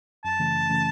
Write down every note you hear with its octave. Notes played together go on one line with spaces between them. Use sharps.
F#2 A5
C#3 E3 A3 C#4
F#2
C#3 E3 A3 C#4